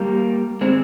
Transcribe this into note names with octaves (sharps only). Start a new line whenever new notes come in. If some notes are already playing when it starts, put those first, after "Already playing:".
Already playing: G3 A#3
G#3 C4